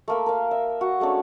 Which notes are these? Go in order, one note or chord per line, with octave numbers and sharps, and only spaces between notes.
A3 A#3 B5
A#4 F5
E5
F#4
G#3 A3 C#4 D4